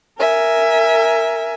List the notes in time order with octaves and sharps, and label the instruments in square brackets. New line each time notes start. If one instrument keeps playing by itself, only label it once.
[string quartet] A#4 E5 G#5